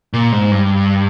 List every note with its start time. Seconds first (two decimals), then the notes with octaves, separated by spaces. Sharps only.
0.13 A#2
0.32 G#2
0.52 G2